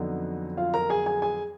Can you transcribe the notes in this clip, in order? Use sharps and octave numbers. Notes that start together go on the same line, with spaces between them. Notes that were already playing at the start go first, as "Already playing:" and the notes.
Already playing: F2 D3 F#3 B3 D#4
F4 F5
A#4 A#5
G#4 G#5
G#4 G#5
G#4 G#5